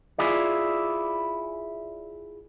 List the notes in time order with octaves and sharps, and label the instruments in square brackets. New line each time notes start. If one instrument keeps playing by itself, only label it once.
[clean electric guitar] E4 F4 G#4 D5